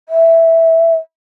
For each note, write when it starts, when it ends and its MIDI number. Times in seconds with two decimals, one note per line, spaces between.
0.09 0.95 76